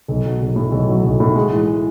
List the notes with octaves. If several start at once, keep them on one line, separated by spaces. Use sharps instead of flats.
B1
F#3
B1
A2
B1
F#3
B1
A2
G#3
E3